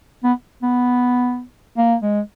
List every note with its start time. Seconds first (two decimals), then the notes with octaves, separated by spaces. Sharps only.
0.24 B3
0.63 B3
1.77 A#3
2.02 G#3